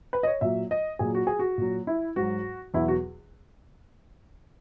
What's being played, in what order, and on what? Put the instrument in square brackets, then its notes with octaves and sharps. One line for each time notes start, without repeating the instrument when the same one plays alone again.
[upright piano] B4
D#5
C#5
A#2 F#3 E5
D#5
A#2 F#3 G#4
F#4
G#4
F#4
A#2 F#3
E4
G#2 F#3 F#4
E2 B2 F#3 E4
F#4